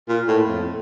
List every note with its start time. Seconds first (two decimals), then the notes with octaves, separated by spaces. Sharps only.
0.08 A#2
0.28 A2
0.47 F2